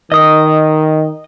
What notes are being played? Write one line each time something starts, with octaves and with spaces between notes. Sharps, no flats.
D#3 D#5 D#6